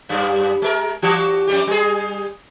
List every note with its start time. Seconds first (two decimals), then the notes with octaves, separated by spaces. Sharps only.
0.09 F#2 G3
0.62 G#3 A#4
1.02 E3 F#4 G4
1.47 F2 G3 G4
1.67 G3 G#4